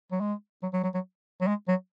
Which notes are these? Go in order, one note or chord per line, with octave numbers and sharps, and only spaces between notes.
F#3
G#3
F#3
F#3
F#3
F#3
F#3
G#3
F#3